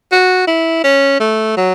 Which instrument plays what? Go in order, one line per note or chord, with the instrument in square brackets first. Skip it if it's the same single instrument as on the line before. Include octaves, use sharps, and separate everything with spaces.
[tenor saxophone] F#4
E4
C#4
A3
F#3